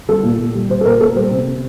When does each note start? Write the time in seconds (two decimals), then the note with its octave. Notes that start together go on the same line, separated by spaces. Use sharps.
0.09 G3 A4
0.23 A#2
0.39 A#2
0.55 G3
0.70 G3 C5
0.81 A4
0.85 A#2 A#4
1.01 A#2 A4
1.16 G3 C5
1.31 C3
1.47 C3